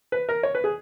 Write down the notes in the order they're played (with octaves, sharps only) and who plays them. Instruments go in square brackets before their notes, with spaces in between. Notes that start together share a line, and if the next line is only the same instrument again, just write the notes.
[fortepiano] B4
A#4
C#5
B4
G#4